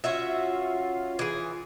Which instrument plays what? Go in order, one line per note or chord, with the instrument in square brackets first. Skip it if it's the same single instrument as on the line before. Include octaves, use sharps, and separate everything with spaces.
[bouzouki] C#4 F#4 E5 [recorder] F4
[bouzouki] E3 G#4